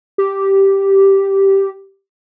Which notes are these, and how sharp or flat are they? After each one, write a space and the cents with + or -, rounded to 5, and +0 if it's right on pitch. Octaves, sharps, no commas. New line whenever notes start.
G4 -5